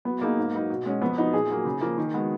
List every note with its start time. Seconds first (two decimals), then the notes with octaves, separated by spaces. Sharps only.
0.05 F#3 B3
0.21 A#3 B3 D#4 G#4
0.38 G#2
0.53 F#3 B3 D#4
0.70 B2
0.85 G#3 C#4 F#4
1.01 F2 B3
1.18 F3 B3 D#4 F#4
1.33 A#2 G#4
1.50 F#3 A#3
1.65 C#3
1.81 F3 A#3
1.98 D#3
2.14 G#3 B3 F#4